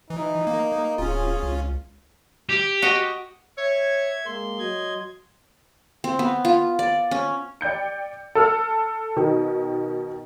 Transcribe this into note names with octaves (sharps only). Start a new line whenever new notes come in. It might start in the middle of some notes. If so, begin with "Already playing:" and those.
E3 D#4
A#3
D1 C#4 F4 G#4
C#2
G4
F#4 D#5
C#5 E5 G#6
G#3 A#3 C6
F#3 D#5 G#6
C4
B3
F4
D5
C#4
D5 G5 G6 C#7
A4 E6 F6
B2 D#3